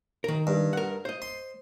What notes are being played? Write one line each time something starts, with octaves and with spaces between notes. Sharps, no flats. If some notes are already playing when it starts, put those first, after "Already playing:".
D#3 A#4
G2
A#4 F#5
C5 D#5
C6